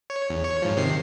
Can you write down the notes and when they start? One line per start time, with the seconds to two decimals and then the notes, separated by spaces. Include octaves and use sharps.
0.10 C#5
0.30 E2
0.44 C#5
0.62 G#2 F3
0.76 C3 D#3 C7